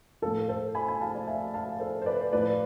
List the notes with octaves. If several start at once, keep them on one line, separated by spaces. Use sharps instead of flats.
A2 F3 A4
A4 C5
G#5 B5
G#5 B5
F5 A5
D5 F5
E5 G#5
F5 A5
A4 C5
C5
B4 D5
A2 F3 B4 D5